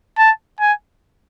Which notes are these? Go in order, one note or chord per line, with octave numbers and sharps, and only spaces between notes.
A5
G#5